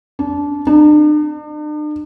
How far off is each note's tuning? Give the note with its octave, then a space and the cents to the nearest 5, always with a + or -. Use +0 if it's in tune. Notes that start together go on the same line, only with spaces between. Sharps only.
D4 -20
D4 +45